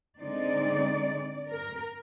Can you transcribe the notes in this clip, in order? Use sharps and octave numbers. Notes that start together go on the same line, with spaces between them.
D3 G#3 C4 D#4 D5
A#4